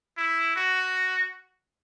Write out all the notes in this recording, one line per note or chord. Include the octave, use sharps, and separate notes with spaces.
E4
F#4